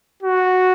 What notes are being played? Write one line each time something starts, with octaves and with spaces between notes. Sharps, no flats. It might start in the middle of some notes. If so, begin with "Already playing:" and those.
F#4